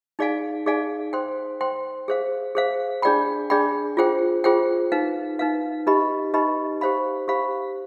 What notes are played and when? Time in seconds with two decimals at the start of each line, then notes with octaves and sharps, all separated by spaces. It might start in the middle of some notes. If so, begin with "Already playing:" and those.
0.19 D#4 G#4 D5 F5 G#5
0.66 D#4 G#4 D5 F5 G#5
1.13 C5 G5 C6
1.61 C5 G5 C6
2.08 G#4 C5 F5
2.55 G#4 C5 F5
3.02 D4 G#4 D5 G5 B5
3.50 D4 G#4 D5 G5 B5
3.97 F4 G#4 C5 G5
4.44 F4 G#4 C5 G5
4.92 D#4 B4 F5
5.39 D#4 B4 F5
5.87 D#4 G4 B4 D#5 B5
6.34 D#4 G4 B4 D#5 B5
6.81 G4 C5 F5 B5
7.28 G4 C5 F5 B5